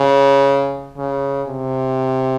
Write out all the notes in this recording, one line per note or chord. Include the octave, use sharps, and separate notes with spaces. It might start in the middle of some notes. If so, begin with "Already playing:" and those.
Already playing: C#3
C#3
C3